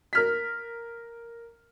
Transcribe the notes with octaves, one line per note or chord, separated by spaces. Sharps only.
A#4 F6 B6